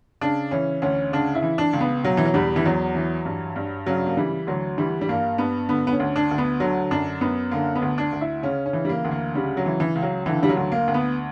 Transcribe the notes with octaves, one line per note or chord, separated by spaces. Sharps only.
C#3 D4
E3 C#4
D2 C#4
C#3 D4
E4
E3
D4
C#2
B3
B2 F#3
E3
F#3
E2 G3
E3
E2 F#3
E3
G2
G2
C#3 F#3
A#3
E3 G3
D2 F#3
E3 G3
G3
G2 A#3
G2 B3
D3 B3
B3
C#4
D2
D4
D2
B3
D3 F#3
F#2 D4
F#2 B3
D3 A#3
B3
D2
D4
D2
E4
C#3 C#4
C#4
E3
G3
A#3
D2
A#3
C#3 G3
F#3
E3
E3
C#2
F#3
D3 E3
G3
F#3
D2
A#3
D2
B3